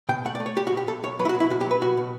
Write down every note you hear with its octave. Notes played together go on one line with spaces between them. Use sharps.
B2 G5
A3 F#5
D5
A3
C#5
B1 G4
F#4
B2
G4
B1 A4
B1 C#5
F#3 B4
E4
F#4
B2
E4
B2 F#4
G4
F#3 B4
B2 F#4
B2